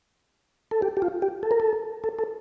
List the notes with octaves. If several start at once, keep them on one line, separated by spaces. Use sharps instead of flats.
A4
G4
G4
F4
G4
A4
A#4
A4
A4
A4